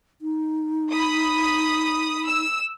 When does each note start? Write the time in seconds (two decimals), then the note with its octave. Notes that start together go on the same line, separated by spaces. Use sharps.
0.22 D#4
0.92 B5 D#6
2.26 E6